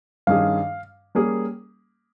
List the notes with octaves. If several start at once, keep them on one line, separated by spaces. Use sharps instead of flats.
G2 D#3 G3 C#4 G#4 F5
G3 A#3 C#4 G#4